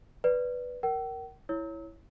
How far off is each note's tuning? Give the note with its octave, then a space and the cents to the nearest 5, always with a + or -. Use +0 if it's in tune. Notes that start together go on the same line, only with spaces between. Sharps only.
B4 +0 D5 +0
A#4 +0 G5 -45
E4 +0 C#5 +0 E6 -40